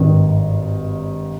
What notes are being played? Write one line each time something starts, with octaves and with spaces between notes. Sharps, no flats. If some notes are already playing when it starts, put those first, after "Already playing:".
Already playing: G#1 G2 D#3